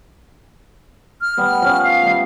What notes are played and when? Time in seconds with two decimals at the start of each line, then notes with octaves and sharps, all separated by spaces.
1.21 F6
1.37 G3 B3
1.62 F3 C#4
1.84 F5
2.03 G3 A3